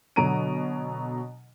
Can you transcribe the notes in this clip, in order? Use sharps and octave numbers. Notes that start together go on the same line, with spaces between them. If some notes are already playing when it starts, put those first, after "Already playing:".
B2 D3 F#3 A#5 D7 D#7